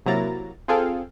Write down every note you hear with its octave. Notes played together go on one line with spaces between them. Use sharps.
C3 F#3 A#3 E4 A#5 A6
C4 F4 G#4 A4 F5 G5